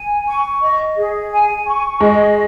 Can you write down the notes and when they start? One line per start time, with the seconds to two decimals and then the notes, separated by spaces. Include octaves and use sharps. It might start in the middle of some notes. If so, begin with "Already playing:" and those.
Already playing: G#5
0.27 C#6
0.62 D#5
0.97 G#4
1.32 G#5
1.66 C#6
2.00 G#3 D#5